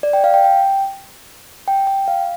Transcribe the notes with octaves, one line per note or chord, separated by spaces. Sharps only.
D5
G5
F5
G5
G5
G5
G5
F5